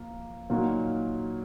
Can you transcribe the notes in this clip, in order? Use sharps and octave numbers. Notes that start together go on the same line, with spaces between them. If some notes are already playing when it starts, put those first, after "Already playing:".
Already playing: F3 A#3
A#2 F#3 A#3 D#4 F#4